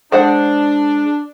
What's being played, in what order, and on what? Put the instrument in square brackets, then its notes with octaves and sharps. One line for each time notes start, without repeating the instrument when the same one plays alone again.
[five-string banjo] G#3 C5 F#5 [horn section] D4